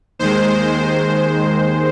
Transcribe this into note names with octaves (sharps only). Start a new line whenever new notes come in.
D#2 D#3 G#3 C5